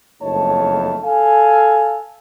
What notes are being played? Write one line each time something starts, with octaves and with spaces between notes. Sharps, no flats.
F#1 F2 A3 D#4 C#5 A5
A4 F5 G#5